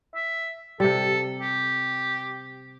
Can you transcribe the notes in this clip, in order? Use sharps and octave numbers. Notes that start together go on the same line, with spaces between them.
E5
C3 G3 A4
G4